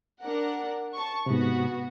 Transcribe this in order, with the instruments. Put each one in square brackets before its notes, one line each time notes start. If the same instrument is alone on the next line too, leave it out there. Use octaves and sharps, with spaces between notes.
[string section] D4 A#4 F#5
A5 C#6
[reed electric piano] G#2 C3 [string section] B3 F#4